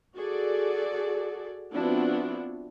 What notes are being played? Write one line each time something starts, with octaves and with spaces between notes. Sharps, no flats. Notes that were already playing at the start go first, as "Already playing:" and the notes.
F#4 G#4 A4 D5
F3 B3 C4 D4 E4 F#4